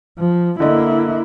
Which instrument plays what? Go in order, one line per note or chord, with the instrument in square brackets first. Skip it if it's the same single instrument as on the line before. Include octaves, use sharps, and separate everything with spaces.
[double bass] F3
[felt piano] D3 D#5 [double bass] A#3 E4